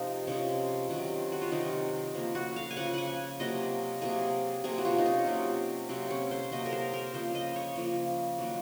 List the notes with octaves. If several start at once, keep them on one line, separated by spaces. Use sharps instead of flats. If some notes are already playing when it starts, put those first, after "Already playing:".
Already playing: C3 F3 G#3 D#4
C3 F3 G#3 C#4
C3 D#3 F#3
F#4
F4
C3 D#3 F#3 D#4
C#3 F3 A#3
F#4
F5
G#5
C#3 F3 A#3 F#5
F#5 G#5
C3 F#3 A#3 D#5
C3 F#3 A#3 G#4
C3 F#3 A#3 G#4
F#4
F4
D#4
C#4
C3 F#3 A#3
C3 F#3 A#3 C4
C#4
C5
C3 F#3 A#3 D#5
A#4
C5
A#4
C#3 F3 A#3 C5
D#5
C#5
C#3 F3 A#3
D#3 F#3 A#3